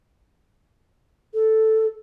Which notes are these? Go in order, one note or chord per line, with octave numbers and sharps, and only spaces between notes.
A4